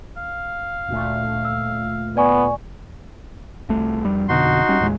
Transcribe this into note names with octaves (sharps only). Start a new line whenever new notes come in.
F5
D2 A#2 A3
E6
B3 D5 G#5 C#6
C2 A3
F2 G3
F2 B2 D3 D#4 F#4 C6
G3 C#4
D#2 A2 G#3